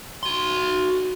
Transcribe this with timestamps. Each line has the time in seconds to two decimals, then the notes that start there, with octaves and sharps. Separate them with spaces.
0.23 F#4 C6